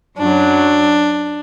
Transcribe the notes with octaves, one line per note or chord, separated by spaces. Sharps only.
F#2 F#3 D4